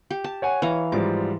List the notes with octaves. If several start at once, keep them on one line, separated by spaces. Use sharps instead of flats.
G4
A5
C#5 F#5 G#5
E3 C#5 F5 A#5
G#2 F3 G3 D6